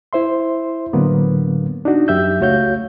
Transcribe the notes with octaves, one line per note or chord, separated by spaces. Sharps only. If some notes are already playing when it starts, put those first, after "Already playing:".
E4 C5 E5 C6
A2 D3 F#3 A#3 B3
D4 D#4 F#4
F#2 G4 E5 E6 G6
C#2 A3 F#4 C#5 F5 G6